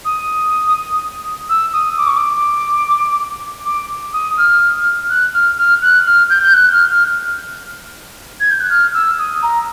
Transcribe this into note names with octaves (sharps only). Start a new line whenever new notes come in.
D#6
E6
D#6
D6
C#6
D6
D6
D#6
F6
F#6
F6
F6
F#6
F6
G6
G6
F#6
F6
F6
G#6
G6
F#6
F6
E6
D#6
A#5